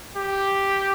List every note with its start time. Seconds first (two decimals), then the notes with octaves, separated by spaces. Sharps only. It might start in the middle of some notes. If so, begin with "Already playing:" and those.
0.17 G4